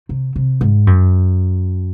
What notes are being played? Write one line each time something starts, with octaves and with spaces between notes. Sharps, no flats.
C3
C3
G#2
F#2